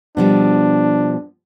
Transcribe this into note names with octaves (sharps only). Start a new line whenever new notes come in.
B2 F3 G3 D4